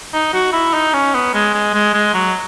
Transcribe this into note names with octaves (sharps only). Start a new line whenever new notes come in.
D#4
F#4
E4
D#4
C#4
B3
G#3
G#3
G#3
G#3
F#3